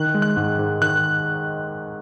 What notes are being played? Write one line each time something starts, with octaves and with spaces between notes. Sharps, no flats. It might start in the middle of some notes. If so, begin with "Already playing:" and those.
Already playing: D#3 F#6
G#3
F#6
G#2
G#2
D#3 F#6